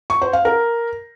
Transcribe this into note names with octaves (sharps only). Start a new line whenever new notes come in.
C#6
C5
F5
A#4